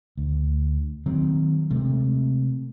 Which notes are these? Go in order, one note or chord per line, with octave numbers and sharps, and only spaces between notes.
D2
D#3 F#3 A#3 C4
C3 G#3 A3 C4